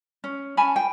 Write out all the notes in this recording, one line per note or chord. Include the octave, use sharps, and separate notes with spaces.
C#4
C#4 G#5 A5 B5
G5